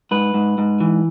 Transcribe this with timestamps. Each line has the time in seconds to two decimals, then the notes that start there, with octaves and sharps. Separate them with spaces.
0.11 G#2 B4
0.34 G#2
0.58 G#2
0.80 E3